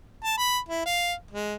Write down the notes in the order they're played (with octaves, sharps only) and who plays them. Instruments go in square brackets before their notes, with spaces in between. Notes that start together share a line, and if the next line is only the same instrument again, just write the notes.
[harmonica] A5
B5
E4
F5
G#3